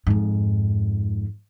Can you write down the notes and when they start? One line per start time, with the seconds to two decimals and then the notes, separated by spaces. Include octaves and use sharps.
0.07 F2 G#2